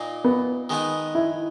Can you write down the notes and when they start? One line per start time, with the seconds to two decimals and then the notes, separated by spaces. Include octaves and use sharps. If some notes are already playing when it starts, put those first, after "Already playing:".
Already playing: A#2 A#3 D#4
0.24 B3
0.69 D#3 G#3 B3 D#4
1.15 E4